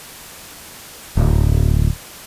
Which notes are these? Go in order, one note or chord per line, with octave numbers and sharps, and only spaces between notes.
D1